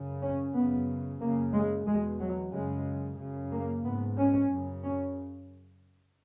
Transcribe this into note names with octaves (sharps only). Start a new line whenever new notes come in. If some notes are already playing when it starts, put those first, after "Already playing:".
Already playing: F#2 C#3
C#4
F#2 C#3 B3
F#2 C#3 A#3
G#3
E2 B2 G#3
F#3
F#2 C#3 G#3
F#2 C#3
A#3
G#2 B3
C#4
F#2 C#3
C#4